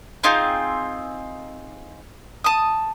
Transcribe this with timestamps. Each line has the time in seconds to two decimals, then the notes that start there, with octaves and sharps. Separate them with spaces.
0.23 C4 D#4 F4 G#4
2.44 A5 D#6